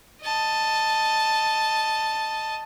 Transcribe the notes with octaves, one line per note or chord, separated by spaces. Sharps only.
D#5 A5